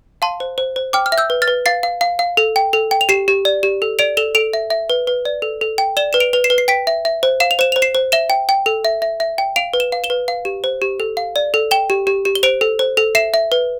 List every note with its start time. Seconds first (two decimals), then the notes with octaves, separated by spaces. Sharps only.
0.22 F5 A5 C6
0.40 C5
0.58 C5
0.76 C5
0.93 G5 D6 F6
1.06 F6
1.12 E5
1.18 E6 G6
1.30 B4
1.42 F6 A6
1.48 B4
1.66 F5 A6 C7
1.83 F5
2.01 F5
2.19 F5
2.37 A4
2.56 G5
2.73 A4
2.91 G5
3.01 F7
3.09 G4 C7 E7
3.28 G4
3.45 D5
3.63 G4
3.82 A4
3.99 D5 D7 F7
4.17 A4 E7 G7
4.35 A4 D7 F7
4.53 E5
4.70 E5
4.90 B4
5.07 B4
5.25 D5
5.42 A4
5.61 A4
5.78 G5
5.97 D5 E7 G7
6.13 B4 E7
6.20 D7 F7
6.33 B4 F7
6.44 C7 E7
6.50 B4
6.58 C7
6.68 G5 B6 D7
6.87 E5
7.05 E5
7.23 C5
7.40 F5 E7
7.51 F7
7.59 C5 E7
7.72 C5 F7
7.82 C7 E7
7.95 C5
8.12 E5 E7 G7
8.30 G5
8.49 G5
8.66 A4
8.85 E5
9.02 E5
9.20 E5
9.38 G5
9.56 F5 D7 F7
9.74 B4
9.80 E7 G7
9.92 F5
10.04 E7 G7
10.10 B4
10.28 F5
10.45 G4
10.64 C5
10.82 G4
11.00 A4
11.17 F5
11.36 D5
11.54 A4
11.71 G5 E7 G7
11.90 G4
12.07 G4
12.25 G4
12.35 G7
12.43 C5 D7 F7
12.61 A4
12.79 C5
12.97 A4
13.15 E5 C7 E7
13.34 E5
13.52 B4